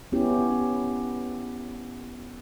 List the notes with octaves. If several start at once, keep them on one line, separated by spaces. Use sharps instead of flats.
B3 C#4 E4 G4